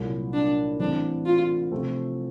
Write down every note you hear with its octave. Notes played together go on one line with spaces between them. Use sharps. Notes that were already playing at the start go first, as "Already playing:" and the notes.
Already playing: C2 A#2 F#3
D4
A2 E3 G3 C4 D4
F4
C3 F3 A3 C4